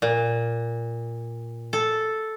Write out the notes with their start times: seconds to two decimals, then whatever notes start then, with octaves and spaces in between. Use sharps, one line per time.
0.02 A#2
1.73 A4